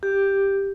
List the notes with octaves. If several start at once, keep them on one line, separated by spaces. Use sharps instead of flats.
G4